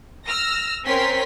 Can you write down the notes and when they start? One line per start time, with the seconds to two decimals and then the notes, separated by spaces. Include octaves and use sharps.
0.25 E6 F6 A#6
0.85 C4 C#4 A#4 C6 B6